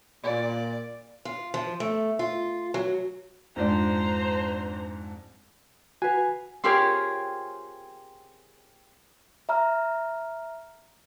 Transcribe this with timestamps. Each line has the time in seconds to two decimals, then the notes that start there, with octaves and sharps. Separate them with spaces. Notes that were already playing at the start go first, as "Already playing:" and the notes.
0.24 A#2 D5
1.25 F4
1.54 F3
1.80 A3
2.19 F4
2.74 F#3
3.56 F2 G#2 D4 C5 A#5
6.02 F#4 B4 G#5
6.64 C4 F4 G4 G#4 A#4 C#5
9.49 E5 A#5 F6